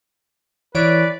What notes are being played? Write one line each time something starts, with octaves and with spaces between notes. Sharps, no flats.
E3 B4 C#5 D5 D7